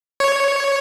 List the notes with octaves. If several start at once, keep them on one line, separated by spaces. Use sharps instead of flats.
C#5